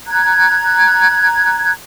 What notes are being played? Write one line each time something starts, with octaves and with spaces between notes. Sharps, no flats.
A#5 F#6 G#6